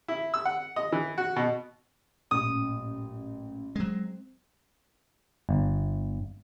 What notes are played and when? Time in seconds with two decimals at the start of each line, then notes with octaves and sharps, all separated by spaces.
0.08 E4
0.34 E6
0.45 F#5
0.76 D#5
0.92 E3
1.18 F#4
1.36 B2
2.31 A1 F#2 A#2 D#6
3.76 F#3 G#3 C4
5.49 G1